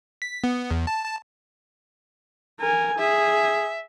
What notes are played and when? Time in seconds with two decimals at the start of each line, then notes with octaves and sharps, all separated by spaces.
0.22 B6
0.44 B3
0.71 E2
0.87 A5
1.04 A5
2.60 A#4 G#5
2.98 G#4 E5